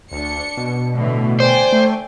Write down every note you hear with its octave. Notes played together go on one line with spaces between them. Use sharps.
D2 D4 C#7
B2
A2 D3 E3
C5 D5 G5 G#5
A3